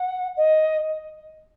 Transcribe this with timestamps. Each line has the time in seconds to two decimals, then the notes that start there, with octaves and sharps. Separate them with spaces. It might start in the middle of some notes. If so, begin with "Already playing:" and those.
Already playing: F#5
0.37 D#5